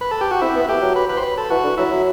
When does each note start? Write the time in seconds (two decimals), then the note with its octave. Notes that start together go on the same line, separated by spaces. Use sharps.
0.01 B4
0.11 A4
0.21 G4
0.31 F#4
0.42 C4 E4
0.56 B3
0.69 A3 G4
0.82 F#3
0.96 B4
1.09 B4
1.17 C5
1.23 B4
1.38 A4
1.50 E3 F#4
1.64 D3
1.77 F#3 E4
1.91 F#3